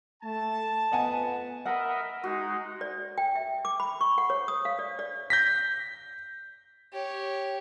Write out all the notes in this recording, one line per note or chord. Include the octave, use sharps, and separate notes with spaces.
A3 A5
F2 B3 D#5 F#5 G#5
A#4 D#5 E5 F#5 B5
G#3 D#4 F#4
D5
G5
E5
D6
B5
C#6
F#5
C#5
D#6
F5
D5
D5
G6 A#6 B6
G4 C#5